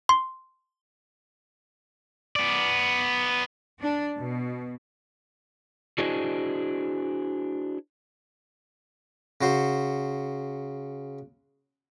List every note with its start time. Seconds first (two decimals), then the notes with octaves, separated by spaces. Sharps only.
0.09 C6
2.36 B3 D5
3.81 D4
4.18 B2
5.98 D4 E4 F#4 G#4 C5 D#5
9.41 C#3 F#4 C5